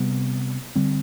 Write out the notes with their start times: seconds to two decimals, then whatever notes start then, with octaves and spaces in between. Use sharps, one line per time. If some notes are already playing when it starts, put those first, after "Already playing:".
Already playing: C3 G3 B3
0.75 D3 G3 C4